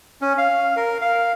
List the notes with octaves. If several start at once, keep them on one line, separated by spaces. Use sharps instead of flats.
C#4
F5
A#4
F5